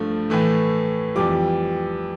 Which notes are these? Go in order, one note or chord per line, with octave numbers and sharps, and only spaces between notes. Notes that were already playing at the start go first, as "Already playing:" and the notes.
Already playing: G2 F3 A3
A2 E3 A3
F2 E3 G3 D6